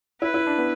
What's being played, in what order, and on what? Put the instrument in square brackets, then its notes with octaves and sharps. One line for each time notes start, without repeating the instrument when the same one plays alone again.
[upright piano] E4 [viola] B4
[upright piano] E4
D4
B3